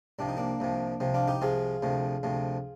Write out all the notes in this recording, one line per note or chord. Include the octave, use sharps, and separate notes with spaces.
C2 C3 F3 D4
D#4
A#3 D4
C2 C3 F3
C2 C3 F3
D4 F4
D#4 G4
C2 C3 F3 F4 G#4
D2 C3 F3
D2 C3 F3